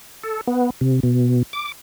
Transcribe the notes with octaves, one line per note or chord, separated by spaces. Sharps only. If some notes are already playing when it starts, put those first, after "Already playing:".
A4
B3
C3
B2
D6